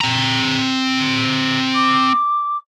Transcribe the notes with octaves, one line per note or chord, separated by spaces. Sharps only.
C4 A#5
D6